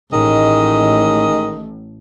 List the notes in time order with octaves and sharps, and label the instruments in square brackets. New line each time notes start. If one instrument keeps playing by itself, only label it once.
[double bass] A1 A2 [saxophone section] D#3 G#3 D#5